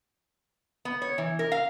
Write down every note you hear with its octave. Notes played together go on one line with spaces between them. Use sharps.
B3
C#5
E3
A#4
F5